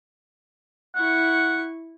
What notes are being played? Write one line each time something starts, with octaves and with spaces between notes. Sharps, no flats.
E4 F#5 C#6